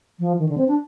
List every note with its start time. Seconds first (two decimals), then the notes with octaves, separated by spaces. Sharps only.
0.20 F3
0.39 D#3
0.49 D3
0.58 C4
0.68 D4